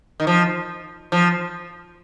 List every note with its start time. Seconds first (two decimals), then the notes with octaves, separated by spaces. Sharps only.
0.20 D#3
0.27 F3
1.12 F3